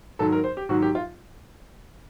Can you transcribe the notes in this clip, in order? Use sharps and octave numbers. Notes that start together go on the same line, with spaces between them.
G#2 D#3 F#3 A4
A#4
C5
G4
G#2 D#3 F#3 F#4
G4
F4